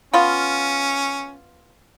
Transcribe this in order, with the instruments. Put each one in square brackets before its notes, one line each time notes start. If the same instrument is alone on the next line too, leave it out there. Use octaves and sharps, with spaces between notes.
[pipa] B3 F4 [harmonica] C#4